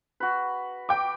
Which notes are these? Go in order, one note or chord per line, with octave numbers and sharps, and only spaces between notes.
F#4 B4
G5 D6